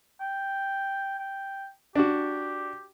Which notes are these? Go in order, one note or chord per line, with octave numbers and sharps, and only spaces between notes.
G5
G5
D4 F#4 G4